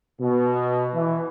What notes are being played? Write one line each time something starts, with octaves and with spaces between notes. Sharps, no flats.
B2
E3